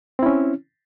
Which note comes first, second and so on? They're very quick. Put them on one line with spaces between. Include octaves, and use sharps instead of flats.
C4 E4 C#4